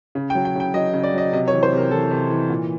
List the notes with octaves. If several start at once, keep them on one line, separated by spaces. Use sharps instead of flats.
C#3
G5
F#3
G5
C#3 G5
F#3 D#5
C#3
D5
F#3 D#5
C3 D#5
C#5
E3
C5
C3 A#4
E3 A4
C3
E3
A#2